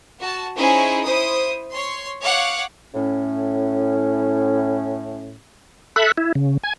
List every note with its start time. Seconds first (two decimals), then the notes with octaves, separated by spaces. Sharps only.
0.19 F#4 A5
0.57 C#4 D#4 E4 G#4 C5
1.05 E4 C5 D#6
1.74 C#5 C6
2.24 C#5 F5 F#5 D6
2.95 A2 C#4
5.96 A4 E5 B5 F#6
6.18 E4
6.35 C#3
6.63 G#5 G#6